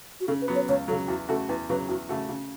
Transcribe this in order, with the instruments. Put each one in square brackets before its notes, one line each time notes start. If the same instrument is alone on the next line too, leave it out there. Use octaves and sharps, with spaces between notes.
[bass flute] F#4
[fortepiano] C#3 [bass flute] A4
[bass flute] B4
[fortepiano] F#3 B3
[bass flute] C#5
[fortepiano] C#2 [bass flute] C#5
[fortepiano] F#3 [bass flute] A4
[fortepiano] C#3
[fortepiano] E2 [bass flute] F#4
[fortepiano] C#3 A3 F#4 [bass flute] A4
[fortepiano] E2 [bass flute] B4
[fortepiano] C#3 F#3 [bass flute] B4
[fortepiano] E2 [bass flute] F#4
[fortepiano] C#3 A3 F#4
C#3